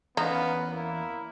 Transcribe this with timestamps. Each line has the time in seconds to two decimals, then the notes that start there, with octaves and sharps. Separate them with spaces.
0.17 E2 B3 C#4 D#4 F5
0.71 A#3 E4